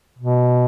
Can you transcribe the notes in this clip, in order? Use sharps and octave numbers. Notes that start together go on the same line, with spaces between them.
B2